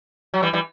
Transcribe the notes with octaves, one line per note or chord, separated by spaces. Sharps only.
F#3
E3 G3
E3 G3